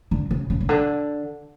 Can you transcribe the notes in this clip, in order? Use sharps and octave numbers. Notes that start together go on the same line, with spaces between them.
D3
C#3
C#3
C#3
D3